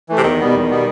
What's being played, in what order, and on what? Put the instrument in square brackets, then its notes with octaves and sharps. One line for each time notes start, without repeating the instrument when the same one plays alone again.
[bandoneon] E3 A3
[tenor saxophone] C3
[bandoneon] E2 [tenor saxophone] D#3
[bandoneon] B2 G3 B3
E2
B2 G3 B3